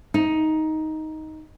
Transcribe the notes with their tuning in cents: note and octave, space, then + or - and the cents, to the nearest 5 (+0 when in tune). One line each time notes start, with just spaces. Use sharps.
D#4 +10